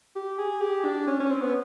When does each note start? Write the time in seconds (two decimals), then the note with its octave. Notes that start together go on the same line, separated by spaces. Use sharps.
0.16 G4
0.39 G#4
0.61 G4
0.85 D4
1.07 C#4
1.20 C#4
1.31 C4
1.42 B3